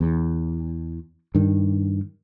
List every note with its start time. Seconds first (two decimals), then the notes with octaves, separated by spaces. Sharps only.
0.01 E2
1.35 G2 D#3